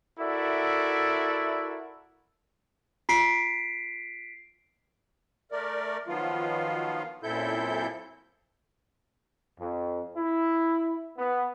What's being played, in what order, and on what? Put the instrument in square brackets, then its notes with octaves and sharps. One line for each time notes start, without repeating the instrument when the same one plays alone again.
[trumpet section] E4 F#4 A4 A#4 D5 E5
[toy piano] F4 [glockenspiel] B6 C7 D7
[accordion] A3 A#4 D5
D#3 F3 F#3 B3 F4
F#2 A#2 C4 E4 A4 G6
[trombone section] F2
E4
B3